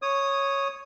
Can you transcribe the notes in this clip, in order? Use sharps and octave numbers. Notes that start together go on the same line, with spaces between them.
C#5 D#6